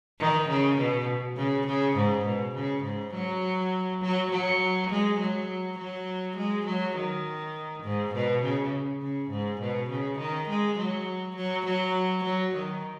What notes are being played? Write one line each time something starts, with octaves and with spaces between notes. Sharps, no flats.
D#3
C#3
B2
C#3
C#3
G#2
B2
C#3
G#2
F#3
F#3
F#3
G#3
F#3
F#3
G#3
F#3
D#3
G#2
B2
C#3
C#3
G#2
B2
C#3
D#3
G#3
F#3
F#3
F#3
F#3
D#3